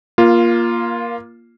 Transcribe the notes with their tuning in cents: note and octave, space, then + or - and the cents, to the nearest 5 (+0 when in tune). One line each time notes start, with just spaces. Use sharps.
A#3 +15 F4 -5